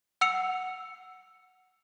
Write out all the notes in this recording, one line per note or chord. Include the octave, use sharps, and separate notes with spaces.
F#5 E6 C#7 F7